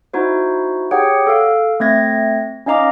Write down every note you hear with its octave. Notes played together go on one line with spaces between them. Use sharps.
D#4 E4 F#4 C5
G4 G#4 C#5 F#5 G5
A4 F5
A3 C4 G#6 A#6
C#4 D#4 D#5 F5 A#5 D6